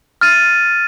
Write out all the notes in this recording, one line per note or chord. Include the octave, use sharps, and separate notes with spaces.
F6 A6 D#7